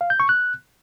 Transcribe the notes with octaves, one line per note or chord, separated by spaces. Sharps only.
F5
G6
C#6
F#6